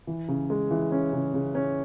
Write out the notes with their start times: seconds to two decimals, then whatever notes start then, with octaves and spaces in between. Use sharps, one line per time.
0.07 E3
0.28 C#3
0.50 G#3
0.71 E3
0.92 C#4
1.13 C#3
1.34 C#3
1.55 C#4